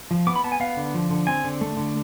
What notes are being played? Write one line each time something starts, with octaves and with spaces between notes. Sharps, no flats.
F3
B3 D6
B5
B3 A5
G#5
B3 F5
D3
F3
D3
C4 G#5
D3
A3
D3